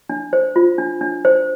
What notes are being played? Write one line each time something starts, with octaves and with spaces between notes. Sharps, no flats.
D4
C5
F4
D4
D4
C5